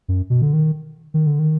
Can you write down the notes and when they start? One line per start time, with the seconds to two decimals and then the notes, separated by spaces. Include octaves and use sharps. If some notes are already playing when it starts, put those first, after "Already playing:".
0.08 F#2
0.30 B2
0.42 D3
0.53 D#3
1.14 D#3
1.26 D3
1.39 D#3